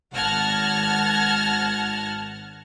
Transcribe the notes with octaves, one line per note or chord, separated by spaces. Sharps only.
G#1 F#5 A5 F6 G#6 A#6